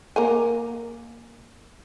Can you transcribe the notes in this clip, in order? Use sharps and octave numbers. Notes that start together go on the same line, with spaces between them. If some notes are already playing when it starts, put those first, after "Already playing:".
A#3 A#4 G#5